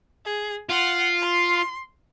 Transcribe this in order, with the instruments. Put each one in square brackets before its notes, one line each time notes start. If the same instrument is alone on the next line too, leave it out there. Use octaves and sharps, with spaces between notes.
[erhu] G#4
[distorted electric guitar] F4 [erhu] F#5
[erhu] C6